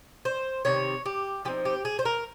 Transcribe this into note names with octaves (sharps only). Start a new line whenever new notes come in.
C5
C3 D#3 C#5
G4
F3 C4 D#4 G4
G4
G#4
C5
A#4